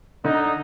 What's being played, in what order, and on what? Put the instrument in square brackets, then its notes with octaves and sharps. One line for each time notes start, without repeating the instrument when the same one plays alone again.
[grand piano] D3 [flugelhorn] D#4